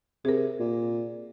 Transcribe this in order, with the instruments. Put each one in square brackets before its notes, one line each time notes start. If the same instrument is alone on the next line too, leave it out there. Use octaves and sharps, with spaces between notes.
[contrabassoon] C3 [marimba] G#4 A#4
[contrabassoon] A#2